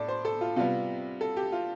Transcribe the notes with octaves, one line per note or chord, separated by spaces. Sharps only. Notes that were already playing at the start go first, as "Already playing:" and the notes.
Already playing: A2 A4 D5
C5
A4
F4
C3 G3 B3 F4
A4
G4
F4